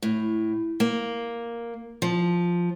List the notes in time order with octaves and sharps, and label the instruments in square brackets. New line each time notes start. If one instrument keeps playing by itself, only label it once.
[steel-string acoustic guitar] A2
A#3
F3